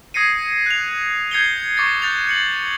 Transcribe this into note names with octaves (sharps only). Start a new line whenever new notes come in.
D#6 G#6 A#6 C7 C#7 D#7
F#6 F7
G6 G#6 C7 C#7 F7 G7
C#6 D6 G6 A6 C#7
F#6 G6 A6 C#7 F7
G6 C#7 F#7